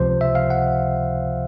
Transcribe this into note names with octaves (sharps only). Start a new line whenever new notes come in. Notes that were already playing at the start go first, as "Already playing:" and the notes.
Already playing: C#2 C3 F3 C5
E5
F5
F#5